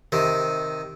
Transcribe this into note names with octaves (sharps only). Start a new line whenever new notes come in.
C3 D#3